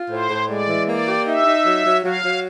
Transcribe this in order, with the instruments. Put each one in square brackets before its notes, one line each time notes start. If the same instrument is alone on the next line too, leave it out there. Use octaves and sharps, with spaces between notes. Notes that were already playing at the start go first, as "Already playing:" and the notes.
Already playing: [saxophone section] F4
[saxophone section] A2 [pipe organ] C5
[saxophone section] A2
[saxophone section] G#3 [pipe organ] D5
[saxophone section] E3
[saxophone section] A#3 [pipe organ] D5
[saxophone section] G4
[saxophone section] D#4 [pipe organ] E5
[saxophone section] D#4
F#3
F#3
[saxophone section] F#3 [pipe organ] F5
[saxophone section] F#3